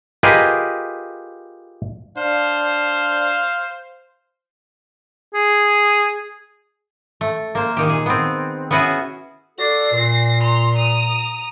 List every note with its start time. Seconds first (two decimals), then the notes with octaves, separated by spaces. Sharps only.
0.23 F4 G4 G#4 A#4 B4 D#5
2.17 D4 C5 F5
5.34 G#4
7.21 A3
7.55 A#3 C5
7.77 A#2 D#3 G4
7.89 G#4
8.06 B3 C4
8.71 B3 C#4 E4 F#4 G#4 B4
9.59 F#4 A4 D5 A#6 C7
9.93 A#2
10.43 A#5 C6
10.75 A#5 D#6